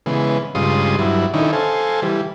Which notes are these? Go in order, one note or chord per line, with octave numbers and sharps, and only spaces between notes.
C#3 E3 G#3 B3
G2 C#3 G#3 F4 C6 D#6
G2 F#3 E4
D3 D#3 C#4 D#4 E4
A4 C5 F5 G#5
E3 G3